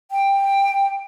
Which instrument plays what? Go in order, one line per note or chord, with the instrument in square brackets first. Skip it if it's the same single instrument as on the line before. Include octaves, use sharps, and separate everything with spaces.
[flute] G5